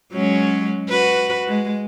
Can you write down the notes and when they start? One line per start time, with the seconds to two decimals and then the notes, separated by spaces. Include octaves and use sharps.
0.12 F#3 G#3 C#4
0.89 F#4 B4
1.47 G#3